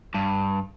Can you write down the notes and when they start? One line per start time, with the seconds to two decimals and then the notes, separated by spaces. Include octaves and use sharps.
0.14 G2